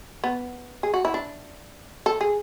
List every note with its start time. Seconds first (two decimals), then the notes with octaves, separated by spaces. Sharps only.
0.24 B3
0.83 G#4
0.94 F#4
1.05 E4
1.14 D4
2.06 A4
2.21 G#4